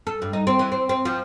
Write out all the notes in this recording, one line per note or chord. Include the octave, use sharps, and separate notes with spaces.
A4
G2
D#4
C4
E3
C4
C4
F3